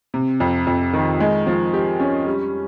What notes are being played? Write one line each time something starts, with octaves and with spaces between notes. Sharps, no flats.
C3
F2
F2
D#3
G#3
F3
G4
C#4
G3